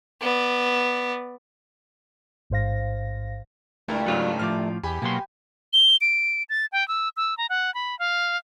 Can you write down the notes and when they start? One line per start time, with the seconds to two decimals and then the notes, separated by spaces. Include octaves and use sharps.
0.21 B3 D5
2.50 A1 G#2 C5 F5 A#6
3.88 C#2 G2 A#2 A3 E4 A#4
4.06 G#2 C#3 F#3 E4 F4
4.39 A2 F3 D6 F6
4.83 E2 G4 G#5 B5
5.02 B2 F#3 A#3 C6
5.73 G7
6.01 D7
6.49 A6
6.72 G5
6.88 E6
7.17 E6
7.38 A#5
7.49 F#5
7.74 B5
7.99 F5